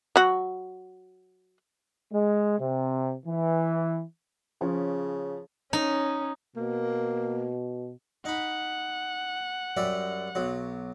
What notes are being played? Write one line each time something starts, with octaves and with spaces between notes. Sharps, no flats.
F#3 F#4
G#3
C3
E3
C#3 F3 C#4
C#4 D#4
B2 A#3
D#4 F#5 B5
F#2 G3 E5
B1 F#3